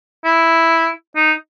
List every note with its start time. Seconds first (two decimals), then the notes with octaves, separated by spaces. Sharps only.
0.25 E4
1.16 D#4